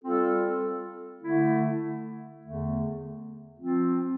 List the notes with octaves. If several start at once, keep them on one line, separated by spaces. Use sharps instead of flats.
G3 C4 F4 A4
D3 A3 E4
E2 D3 A3
F3 C4 F4